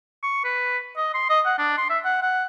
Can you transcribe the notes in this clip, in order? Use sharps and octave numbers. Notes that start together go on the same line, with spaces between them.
C#6
B4
D#5
C6
D#5
F#5
D4
C6
E5
F#5
F#5